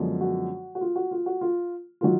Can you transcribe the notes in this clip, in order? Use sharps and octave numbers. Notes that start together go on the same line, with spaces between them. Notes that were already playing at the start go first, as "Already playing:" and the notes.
Already playing: F#2 D3 F3 G#3 B3
F#4
F#4
F4
F#4
F4
F#4
F4
D#3 F#3 F4